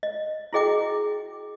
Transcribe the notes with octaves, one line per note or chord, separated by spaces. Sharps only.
D#5
E4 F#4 G#4 D#5 G5 D6